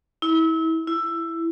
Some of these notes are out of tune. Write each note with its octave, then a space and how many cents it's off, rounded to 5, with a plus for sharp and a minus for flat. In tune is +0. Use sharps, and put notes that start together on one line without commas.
E4 -30
E4 +10